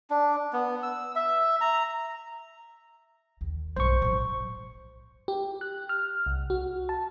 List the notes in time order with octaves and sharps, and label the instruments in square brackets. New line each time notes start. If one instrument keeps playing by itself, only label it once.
[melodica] D4
B3
E6
E5
A#5
[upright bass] D#2
[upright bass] B1 G2 [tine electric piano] C5 C#6
[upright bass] A1 F#2
[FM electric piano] G4
F#6
F6
C2
F#4
A5